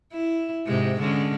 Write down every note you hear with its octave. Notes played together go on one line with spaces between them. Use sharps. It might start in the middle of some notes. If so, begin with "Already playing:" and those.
E4
G#2 C3 G#3
D3 G#3 C#4